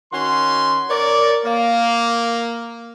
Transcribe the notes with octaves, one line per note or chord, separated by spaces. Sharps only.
D#3 C#4 F#4 C6
A#4 C#5 D5
A#3